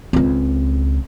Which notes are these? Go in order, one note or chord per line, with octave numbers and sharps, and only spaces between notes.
C#2 C4